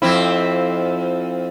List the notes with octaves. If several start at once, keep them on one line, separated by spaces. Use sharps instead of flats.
F2 C4 E4